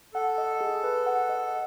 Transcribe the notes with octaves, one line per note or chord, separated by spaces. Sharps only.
A4 F#5
D#5
G#4
B4
F#5
D#5